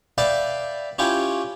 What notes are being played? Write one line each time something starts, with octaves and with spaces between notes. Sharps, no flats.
B4 D5 E5 F5 G5 A5
C#4 E4 F4 G4 C#5 G5